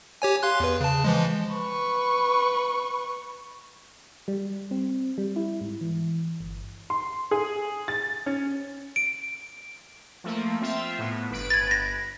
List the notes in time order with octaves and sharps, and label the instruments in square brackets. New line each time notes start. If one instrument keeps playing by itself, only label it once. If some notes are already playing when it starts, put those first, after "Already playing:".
[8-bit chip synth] G4 C#5 G#5
F5 C6 F#6
E2 B4
C#3 A5
E3 F3 G#3
[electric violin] B4 C#6
[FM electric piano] G3
C4
G3
E4
G#2
E3
G1
[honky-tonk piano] C6
G#4
A6
C#4
[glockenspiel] D7
[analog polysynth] F3 A3 A#3
C4 F4 E5
A2 B3
G1 B4 D7
[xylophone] G#6 A6
A#6